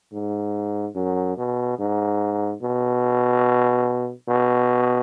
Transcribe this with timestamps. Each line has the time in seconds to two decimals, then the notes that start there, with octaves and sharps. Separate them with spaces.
0.12 G#2
0.95 F#2
1.37 B2
1.78 G#2
2.62 B2
4.28 B2